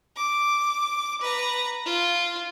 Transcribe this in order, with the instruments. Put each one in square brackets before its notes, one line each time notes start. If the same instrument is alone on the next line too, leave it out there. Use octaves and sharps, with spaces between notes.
[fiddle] D6
B4 A#5
F4